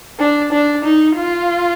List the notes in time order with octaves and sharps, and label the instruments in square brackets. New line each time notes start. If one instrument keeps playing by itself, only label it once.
[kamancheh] D4
D4
D#4
F4